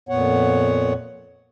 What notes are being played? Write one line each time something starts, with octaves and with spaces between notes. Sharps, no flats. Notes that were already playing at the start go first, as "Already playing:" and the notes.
F2 A#2 B3 C#5 F#5